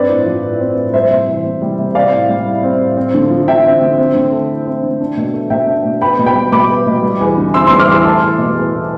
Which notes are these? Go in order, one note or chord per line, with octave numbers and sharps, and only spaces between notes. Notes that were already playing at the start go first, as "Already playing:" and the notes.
Already playing: G2 C4 B4 D5
A2
F3
A2
C4
A2
G3 C5 E5
C3
E3
C3
G3
C3
C4 D5 F5
A2
G3
E4
C4
A2
C4
D3
F3
D3 E5 G5
C4
D3
C4
D3
A3
E4
C4
D3
D4
B2
A3
B2 E5 G5
D4
B2
B3 G5 B5
B2
G5 B5
G3
B2 B5 D6
B3
B2
G3
E2
D3
C4 C6 E6
G3 C6 E6
D6 F6
E2 C6 E6
A3 A5 C6
E2
B2
E2
A3